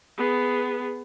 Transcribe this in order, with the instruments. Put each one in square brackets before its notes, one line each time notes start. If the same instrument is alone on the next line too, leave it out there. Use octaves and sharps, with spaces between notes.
[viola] B3 G#4